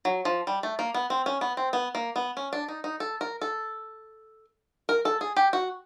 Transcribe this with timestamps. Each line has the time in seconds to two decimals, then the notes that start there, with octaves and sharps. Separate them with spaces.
0.05 F#3
0.25 F3
0.47 G3
0.63 A3
0.79 A#3
0.94 B3
1.10 C4
1.26 C#4
1.41 B3
1.57 C4
1.73 B3
1.95 A#3
2.16 B3
2.37 C#4
2.53 D4
2.68 D#4
2.84 D#4
3.00 A4
3.21 A#4
3.41 A4
4.89 A#4
5.05 A4
5.21 G#4
5.37 G4
5.53 F#4